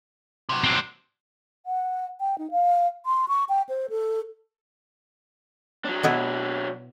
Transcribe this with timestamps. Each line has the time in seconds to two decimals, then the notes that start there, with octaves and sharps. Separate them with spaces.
0.49 C3 F#3
0.64 C4 D4
1.65 F#5
2.20 G5
2.38 D#4
2.51 F5
3.06 C6
3.28 C#6
3.49 G5
3.69 C5
3.90 A4
5.85 F#3 D4
6.03 B2 B3 E4